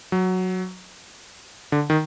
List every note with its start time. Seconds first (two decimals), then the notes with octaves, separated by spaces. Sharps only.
0.12 F#3
1.72 D3
1.90 D#3